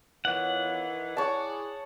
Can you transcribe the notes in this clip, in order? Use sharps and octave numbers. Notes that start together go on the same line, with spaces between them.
E2 D#3 E3 F4 C#5 F#5
E4 G#4 C#5 D5 A5